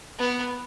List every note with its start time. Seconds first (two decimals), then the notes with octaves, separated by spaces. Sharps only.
0.19 B3